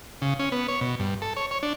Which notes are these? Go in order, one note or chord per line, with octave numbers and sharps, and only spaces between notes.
C#3
C#4
B3
C#5
B2
G2
A4
C#5
C#5
D4